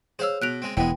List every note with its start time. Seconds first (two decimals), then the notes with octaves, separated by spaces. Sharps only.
0.19 G#4 C5 C#5 F5 E6
0.42 B2 F#6 D7 F7
0.62 G#3 C4
0.77 E1 G#3 B3 E4 G5